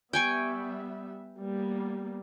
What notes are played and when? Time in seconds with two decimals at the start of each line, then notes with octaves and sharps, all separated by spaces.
0.13 G3 B3 E5 G5 G#5 C#6
1.39 G3 A#3 B3